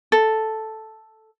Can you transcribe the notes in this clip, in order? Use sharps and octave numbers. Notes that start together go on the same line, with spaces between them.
A4